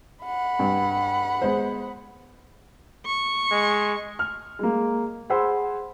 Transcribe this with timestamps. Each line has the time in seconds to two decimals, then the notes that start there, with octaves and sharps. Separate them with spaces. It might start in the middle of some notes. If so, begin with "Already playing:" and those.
0.25 F#5 B5
0.59 G2
1.42 G#3 B3 C5
3.06 C#6
3.52 G#3
4.19 F6
4.59 G#3 A#3
5.30 G#4 C5 F#5 B5 C6 E6